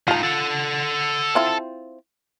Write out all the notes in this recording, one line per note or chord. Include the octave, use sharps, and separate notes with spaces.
A2 D#4 F4 A5
A4 F#5
C4 E4 F4